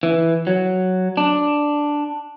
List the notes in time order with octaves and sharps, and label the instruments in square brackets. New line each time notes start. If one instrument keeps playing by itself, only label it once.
[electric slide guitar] E3
F#3
D4